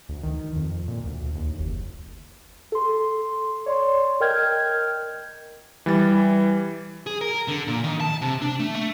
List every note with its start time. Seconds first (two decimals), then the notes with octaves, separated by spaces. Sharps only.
0.09 D2
0.23 D#3
0.56 F2
0.88 A#2
1.06 D2
1.35 D#2
1.60 F#1
2.72 A4 C6
3.66 C#5 D5 C6
4.20 A#4 D#5 G5 F6 G6 G#6
5.86 E3 G3 A6
7.06 G#4
7.21 A#4
7.48 D3
7.68 A#2
7.84 D#3
8.00 A5
8.22 C3
8.42 D4
8.59 A3
8.76 A3